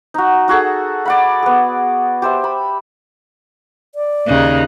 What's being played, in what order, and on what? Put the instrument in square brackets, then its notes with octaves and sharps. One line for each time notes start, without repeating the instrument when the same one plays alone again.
[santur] D#4 F#4
D#4 F#4 G#4 A4
D5 F#5 B5
B3 G#4
G4 C5 E5
B5
[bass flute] D5
[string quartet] D#2 D#4 F#6 [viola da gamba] C#3